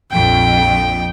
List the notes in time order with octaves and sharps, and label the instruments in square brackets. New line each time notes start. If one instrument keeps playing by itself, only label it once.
[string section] A#1 F2 [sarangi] G5